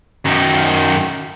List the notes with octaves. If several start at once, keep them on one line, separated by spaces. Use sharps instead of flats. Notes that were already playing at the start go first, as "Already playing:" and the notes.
F#2 D#3